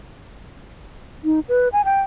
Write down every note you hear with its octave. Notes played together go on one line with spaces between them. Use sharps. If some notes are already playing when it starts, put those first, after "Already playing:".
D#4
B4
G#5
G5